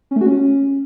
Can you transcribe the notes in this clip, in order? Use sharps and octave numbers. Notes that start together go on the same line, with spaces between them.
C#4
A3
F#4
C#4